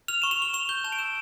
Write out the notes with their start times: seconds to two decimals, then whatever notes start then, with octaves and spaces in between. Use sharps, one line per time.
0.08 F6 F7
0.22 C#6 E7
0.31 F7
0.39 C#6 G7
0.53 C#6 F7
0.69 G6 G7
0.84 A5 F7
0.92 D7
0.99 E6 E7